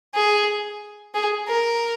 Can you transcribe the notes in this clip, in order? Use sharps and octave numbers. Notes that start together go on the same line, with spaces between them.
G#4
G#4
A#4